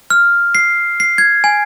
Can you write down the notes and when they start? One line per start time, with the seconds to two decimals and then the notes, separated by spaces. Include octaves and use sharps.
0.10 F6
0.55 C7
1.00 C7
1.18 G#6
1.44 G#5